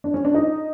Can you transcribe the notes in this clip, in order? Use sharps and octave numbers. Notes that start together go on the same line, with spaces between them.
D4
C#4
D4
D#4